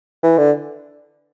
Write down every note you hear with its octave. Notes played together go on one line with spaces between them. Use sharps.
E3
D3